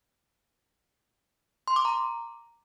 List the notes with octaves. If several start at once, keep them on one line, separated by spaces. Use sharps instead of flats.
C6
D6
A#5